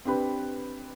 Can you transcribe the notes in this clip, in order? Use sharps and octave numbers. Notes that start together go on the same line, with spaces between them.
C4 D4 G4 B4 B5